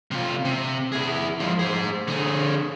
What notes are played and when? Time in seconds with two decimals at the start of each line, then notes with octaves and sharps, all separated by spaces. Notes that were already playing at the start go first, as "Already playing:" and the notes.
0.11 C3 F4
0.45 C3
0.92 E4 G#4
1.40 F3 G#3
1.59 G#4 C5
2.08 D3 G#4